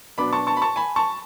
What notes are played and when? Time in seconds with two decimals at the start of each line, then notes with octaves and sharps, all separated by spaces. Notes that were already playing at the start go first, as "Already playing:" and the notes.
0.18 B2 F#3 B3 D4 B5 D6
0.33 A5 C#6
0.47 A5 C#6
0.57 B5
0.62 A5 C#6
0.76 G#5 B5
0.96 A5 C#6